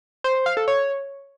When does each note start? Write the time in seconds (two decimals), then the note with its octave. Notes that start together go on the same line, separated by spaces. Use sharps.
0.24 C5
0.35 C5
0.46 F5
0.57 A4
0.68 C#5